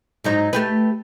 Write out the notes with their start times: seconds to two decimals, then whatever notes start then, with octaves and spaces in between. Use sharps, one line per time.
0.24 G#2 F#3 D#4
0.53 A3 G4 B4